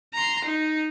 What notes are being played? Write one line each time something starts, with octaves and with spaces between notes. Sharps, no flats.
A#5 C6
D#4